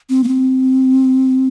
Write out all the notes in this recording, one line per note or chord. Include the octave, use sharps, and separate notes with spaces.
C4
A#3
C4